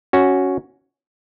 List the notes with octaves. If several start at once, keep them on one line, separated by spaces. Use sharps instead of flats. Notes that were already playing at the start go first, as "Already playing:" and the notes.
C#4 F#4